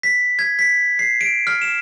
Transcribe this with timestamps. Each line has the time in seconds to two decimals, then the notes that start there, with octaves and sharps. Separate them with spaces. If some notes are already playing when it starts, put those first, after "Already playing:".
0.03 B6
0.39 G#6
0.59 B6
0.99 C7
1.21 D7
1.47 F6
1.62 E7